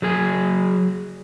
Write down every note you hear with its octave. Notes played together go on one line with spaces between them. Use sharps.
F#3 G#4 G#5